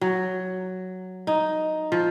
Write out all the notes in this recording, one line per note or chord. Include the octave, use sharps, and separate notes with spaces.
F#3
D#4
F3